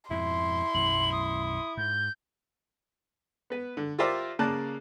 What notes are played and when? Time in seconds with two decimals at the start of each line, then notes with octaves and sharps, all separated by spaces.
0.11 F2 G#2 B2 E4 C6
0.74 B1 F#2 E3 F#7
1.12 D#6
1.77 G#2 G6
3.50 B3 B4
3.77 D3
3.99 F4 G4 A#4 C5 D5 E5
4.39 C#3 A#3 D5 A5 F#6